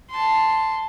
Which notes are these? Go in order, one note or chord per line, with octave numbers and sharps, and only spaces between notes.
A5 C6